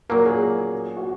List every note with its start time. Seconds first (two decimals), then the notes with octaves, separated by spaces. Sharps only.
0.09 A#2 F#3 A#3 A#4
0.25 G#4
0.97 F#4